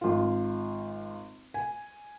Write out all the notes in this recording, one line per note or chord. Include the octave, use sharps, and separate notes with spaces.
G#1 F4
G#5